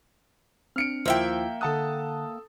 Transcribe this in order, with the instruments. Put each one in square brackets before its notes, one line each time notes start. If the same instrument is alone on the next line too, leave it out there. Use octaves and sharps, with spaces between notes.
[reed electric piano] C4 D4 [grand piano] F6 C#7 D7
[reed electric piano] D#2 E4 [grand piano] F3 C5 [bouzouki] A#3 E5 G5
[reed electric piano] D3 F#5 F#6 [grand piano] A4 A5 D#6